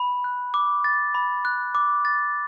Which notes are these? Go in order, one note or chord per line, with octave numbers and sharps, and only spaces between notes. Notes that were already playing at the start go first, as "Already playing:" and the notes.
Already playing: B5
F#6
D6
A6
B5
F#6
D6
A6